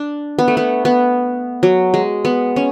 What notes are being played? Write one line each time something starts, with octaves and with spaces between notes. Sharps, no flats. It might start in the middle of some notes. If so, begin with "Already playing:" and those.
Already playing: D4
B3
A3
B3
B3
F#3
G#3
B3
C#4